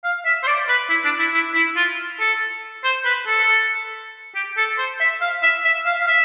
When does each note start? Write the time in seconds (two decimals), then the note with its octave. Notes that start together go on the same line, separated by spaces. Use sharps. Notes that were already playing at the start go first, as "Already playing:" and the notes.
0.04 F5
0.26 E5
0.43 C5
0.47 D5
0.69 B4
0.90 E4
1.05 D4
1.19 E4
1.34 E4
1.54 E4
1.76 F4
2.19 A4
2.84 C5
3.05 B4
3.27 A4
4.35 G4
4.57 A4
4.78 C5
5.00 E5
5.22 F5
5.43 E5
5.64 E5
5.86 F5
6.00 F5
6.08 E5